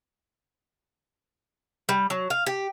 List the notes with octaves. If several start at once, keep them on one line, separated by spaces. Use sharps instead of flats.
G3
F#3
F5
G4